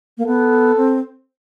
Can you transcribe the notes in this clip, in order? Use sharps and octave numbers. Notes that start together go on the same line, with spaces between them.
A#3
B3 A4
C4